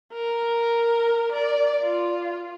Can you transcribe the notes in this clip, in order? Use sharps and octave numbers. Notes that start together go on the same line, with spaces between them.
A#4
D5
F4